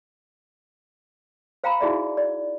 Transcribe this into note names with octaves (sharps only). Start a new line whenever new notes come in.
C5 F5 G5 A#5 B5
D#4 E4 F#4 G#4 D5 E5
D5